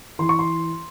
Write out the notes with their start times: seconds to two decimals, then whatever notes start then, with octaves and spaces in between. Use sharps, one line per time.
0.19 E3 C6
0.29 C#6
0.39 C6